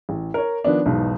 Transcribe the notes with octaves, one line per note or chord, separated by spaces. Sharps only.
A1
A#4 C#5
D#3 F3 B3 D4
B1 E2 G#2 B2